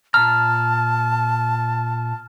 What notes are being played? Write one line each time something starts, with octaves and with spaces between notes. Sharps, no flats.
A#2 A5 A#5 F6